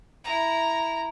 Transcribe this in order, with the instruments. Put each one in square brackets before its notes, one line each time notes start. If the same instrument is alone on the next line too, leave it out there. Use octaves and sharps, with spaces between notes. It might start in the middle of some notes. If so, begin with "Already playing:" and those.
[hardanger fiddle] E4 A#5